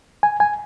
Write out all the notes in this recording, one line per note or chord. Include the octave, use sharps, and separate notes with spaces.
G#5
G#5